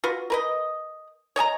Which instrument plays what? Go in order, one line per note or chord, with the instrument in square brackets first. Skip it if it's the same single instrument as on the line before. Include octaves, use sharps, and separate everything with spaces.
[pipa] F4 F#4 B4
A#4 B4 D#5
C#5 D#5 G#5 A#5